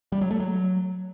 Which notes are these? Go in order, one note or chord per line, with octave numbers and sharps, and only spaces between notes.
G3
F#3
A3
F#3